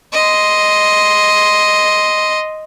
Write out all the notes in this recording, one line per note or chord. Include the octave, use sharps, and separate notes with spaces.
D#5 C6